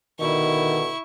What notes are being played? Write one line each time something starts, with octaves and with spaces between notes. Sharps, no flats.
B2 D3 D#3 E4 C#6